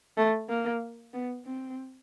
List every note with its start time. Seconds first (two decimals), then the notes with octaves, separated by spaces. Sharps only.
0.17 A3
0.49 A#3
1.14 B3
1.45 C4